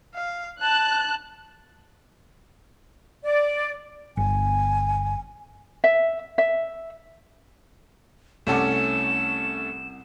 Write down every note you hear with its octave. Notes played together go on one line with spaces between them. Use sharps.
F5
A5 F#6
D5
G1 G#5
E5
E5
C2 A3 C#4 A4 F#5 D6 E7